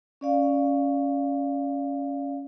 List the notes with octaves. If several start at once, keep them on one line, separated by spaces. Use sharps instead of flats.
C#4 D5 F5